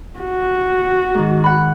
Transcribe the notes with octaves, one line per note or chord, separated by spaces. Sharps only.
F#4
G#2 D#3
F#5 B5